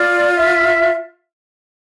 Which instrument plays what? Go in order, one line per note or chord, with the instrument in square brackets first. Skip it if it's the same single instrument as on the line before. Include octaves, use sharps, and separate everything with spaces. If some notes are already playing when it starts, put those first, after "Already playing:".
Already playing: [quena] F4 [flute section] D5
[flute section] E5